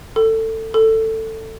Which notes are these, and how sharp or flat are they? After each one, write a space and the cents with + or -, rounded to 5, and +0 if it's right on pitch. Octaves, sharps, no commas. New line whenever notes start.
A4 +20
A4 +15